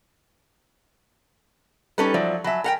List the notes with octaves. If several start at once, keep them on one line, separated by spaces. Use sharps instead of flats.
G3 C#4 D#4 A4 B4
F3 F#3 D5 E5
F#3 E5 G#5 A5 B5
A#4 F#5 G5